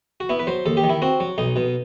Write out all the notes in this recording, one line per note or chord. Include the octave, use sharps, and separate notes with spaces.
F#4
B3 E4
B4
F#3 C5
D#2 A4
G4
D#3
E4
C4 F#4
F#3
B1 D#4
B2